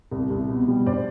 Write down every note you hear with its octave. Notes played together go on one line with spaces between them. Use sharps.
C2
C2
B2
G3
G2 C5 D5